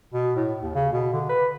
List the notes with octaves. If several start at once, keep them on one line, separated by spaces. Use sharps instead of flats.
B2
A2
D#2
C#3
B2
D3
B4